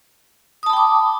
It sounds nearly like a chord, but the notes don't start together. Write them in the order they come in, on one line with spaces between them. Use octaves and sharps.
D#6 A5 B5 G5 D6